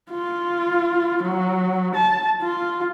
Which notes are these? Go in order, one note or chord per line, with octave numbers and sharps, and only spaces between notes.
F4
F#3
A5
F4